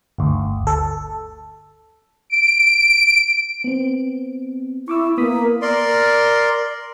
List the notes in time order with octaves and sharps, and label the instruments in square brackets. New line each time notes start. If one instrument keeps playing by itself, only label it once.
[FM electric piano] G1 D2
A4
[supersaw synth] D7
[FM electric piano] B3 C4
[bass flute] E4 [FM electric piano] C#6 D6 E6
[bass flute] A#3 [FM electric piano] B3 D#6 B6
[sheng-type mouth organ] A#4 D5 C6